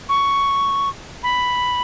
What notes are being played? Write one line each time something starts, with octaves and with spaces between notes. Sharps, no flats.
C#6
B5